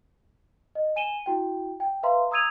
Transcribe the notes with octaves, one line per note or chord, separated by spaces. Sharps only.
D#5
G#5 D#7 E7 G7
E4 F#4 G5
G5
B4 E5 F5 A#5 C6
A#5 D#6 E6 G#6 D#7 F7